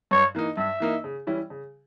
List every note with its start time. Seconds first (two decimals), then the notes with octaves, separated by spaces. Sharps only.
0.11 G2 C#5
0.35 E3 A#3 D#4
0.57 G2 E5
0.80 E3 A#3 D#4
1.04 C#3
1.27 E3 G3 C#4 E4
1.50 C#3